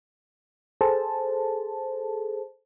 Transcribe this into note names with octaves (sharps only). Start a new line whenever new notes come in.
G#4 A4 C5 A5